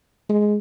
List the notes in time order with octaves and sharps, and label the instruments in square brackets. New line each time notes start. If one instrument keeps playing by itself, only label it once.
[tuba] G#3